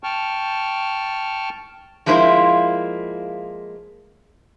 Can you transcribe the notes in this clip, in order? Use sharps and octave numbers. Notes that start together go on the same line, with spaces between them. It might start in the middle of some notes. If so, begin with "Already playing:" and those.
G5 A5 C#6 F6
F3 G#3 A#3 E4 C5